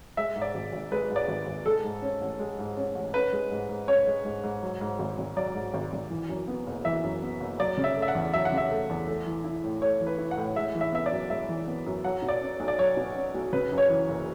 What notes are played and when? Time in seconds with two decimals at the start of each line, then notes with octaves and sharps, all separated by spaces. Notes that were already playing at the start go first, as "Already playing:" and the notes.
0.17 G#3 E5
0.36 G#2
0.42 D5
0.55 G#1
0.72 G#1
0.91 G#3 B4
1.10 G#2
1.16 D5
1.28 G#1
1.47 G#1
1.66 G#3 A4
1.84 G#2
2.02 C#4
2.21 A1
2.39 G#3
2.59 G#2
2.77 C#4
2.95 A1
3.14 C#4 B4
3.32 G#3
3.51 G#2
3.69 G#2
3.88 C#4 C#5
4.07 G#3
4.25 G#2
4.43 G#2
4.62 F#3
4.81 G#2
4.99 G#1
5.18 G#1
5.36 F#3 D5
5.55 G#2
5.74 G#1
5.93 G#1
6.10 E3
6.29 F#2
6.48 B3
6.67 F#1
6.85 E3 E5
7.03 F#2
7.22 B3
7.40 F#1
7.59 F#3 D5
7.77 C#3
7.84 E5
7.97 A3
8.02 E5
8.08 F#5
8.15 E2
8.33 F#3 E5
8.45 F#5
8.52 C#3
8.58 E5
8.71 A3
8.89 E2
9.07 A3
9.27 E3
9.44 E4
9.64 A2
9.81 A3 C#5
10.01 E3
10.07 B4
10.18 E4
10.31 F#5
10.37 A2
10.56 G#3 E5
10.75 E3
10.81 E5
10.93 B3 E5
11.06 D5
11.12 F#2
11.30 G#3 E5
11.49 E3
11.67 B3
11.86 F#2
12.04 F#3 F#5
12.22 B2
12.28 D5
12.41 C#4
12.60 B1
12.68 D5
12.78 F#3 C#5
12.97 B2
13.15 C#4
13.34 B1
13.53 C#3 B4
13.72 F#2
13.78 C#5
13.89 E3
14.09 F#1